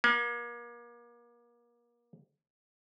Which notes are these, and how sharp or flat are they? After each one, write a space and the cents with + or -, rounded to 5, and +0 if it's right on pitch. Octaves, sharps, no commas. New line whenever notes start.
A#3 +35